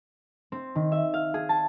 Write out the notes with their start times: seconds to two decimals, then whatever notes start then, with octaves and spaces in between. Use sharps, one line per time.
0.52 C4
0.75 D#3
0.92 E5
1.14 F5
1.34 G#4
1.49 A5